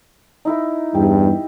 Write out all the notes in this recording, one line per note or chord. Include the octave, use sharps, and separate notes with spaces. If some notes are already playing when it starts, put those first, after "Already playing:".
D#4 E4 A#4
E2 G2 G4